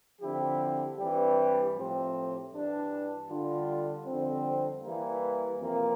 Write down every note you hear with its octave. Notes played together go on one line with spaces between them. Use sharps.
D3 F3 C4 E4 G4
G2 E3 G3 C4 G4
A2 F3 A3 C4 G4
G2 E3 G3 D4
D3 G3 D4 F4
F2 D3 G3 C4
E3 G3 A#3
F2 C3 E3 A#3